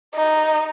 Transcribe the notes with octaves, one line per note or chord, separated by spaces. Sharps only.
D#4